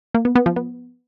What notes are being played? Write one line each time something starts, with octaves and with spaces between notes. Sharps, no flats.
A#3
B3
B3
F3
B3